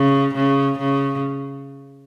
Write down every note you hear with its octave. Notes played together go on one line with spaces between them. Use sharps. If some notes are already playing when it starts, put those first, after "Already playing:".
Already playing: C#3
C#3
C#3